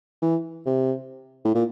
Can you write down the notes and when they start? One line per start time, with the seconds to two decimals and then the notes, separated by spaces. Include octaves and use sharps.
0.22 E3
0.66 C3
1.45 A2
1.55 A#2